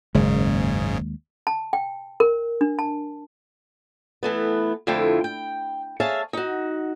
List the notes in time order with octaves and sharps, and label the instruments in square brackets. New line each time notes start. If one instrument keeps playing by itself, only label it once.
[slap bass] F#1 [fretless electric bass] D#2 G#3 [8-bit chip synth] G#2 C#3
[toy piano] A5
G5
A#4
D4
A5
[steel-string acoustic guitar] E3 A3 B3
F2 D3 A3 E4 F4 G5
G5
G#4 C#5 E5 F5 A5
D#4 F#4